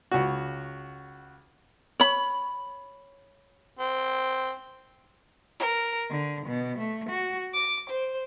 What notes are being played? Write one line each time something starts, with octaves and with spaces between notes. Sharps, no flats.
C#2 F#4
C#5 B5
C4
A#4
D3
B2
A3
F#4
D6
C5